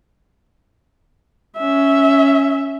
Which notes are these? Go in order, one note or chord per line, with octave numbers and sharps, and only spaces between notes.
C#4 E5